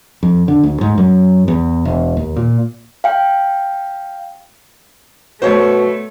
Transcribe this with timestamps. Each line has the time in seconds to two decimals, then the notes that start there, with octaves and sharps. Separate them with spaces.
0.23 F2
0.48 D3
0.64 D2
0.81 G#2
0.98 F#2
1.48 E2
1.85 E1
2.17 D#2
2.36 A#2
3.04 F5 G5
5.42 B2 A3 C5 C#5